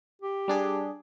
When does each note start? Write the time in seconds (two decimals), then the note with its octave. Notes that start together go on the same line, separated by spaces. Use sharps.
0.22 G4
0.48 G3 D4 G#4